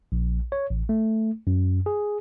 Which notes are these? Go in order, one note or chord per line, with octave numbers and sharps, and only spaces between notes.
A#1
C#5
A1
A3
F#2
G#4